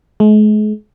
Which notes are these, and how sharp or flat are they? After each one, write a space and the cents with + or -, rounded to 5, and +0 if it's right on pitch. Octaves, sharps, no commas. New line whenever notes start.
G#3 +40